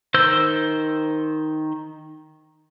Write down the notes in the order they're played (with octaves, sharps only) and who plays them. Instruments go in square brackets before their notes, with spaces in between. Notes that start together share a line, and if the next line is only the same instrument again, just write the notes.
[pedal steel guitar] D#3 C5 E6 G6